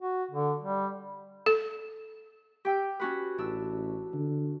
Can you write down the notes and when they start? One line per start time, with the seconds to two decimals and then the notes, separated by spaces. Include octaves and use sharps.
0.01 F#4
0.31 D3
0.62 G3
1.46 A4
2.65 G4 G5 E6
3.00 C#4 F#4 B4
3.38 A1 D4 E6
4.14 D3